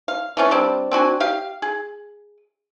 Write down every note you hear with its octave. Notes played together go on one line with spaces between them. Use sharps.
F5
E3 A3 C#4
G3 C4 D4
C4 D4 F#4 G#5
G4 F5
G#4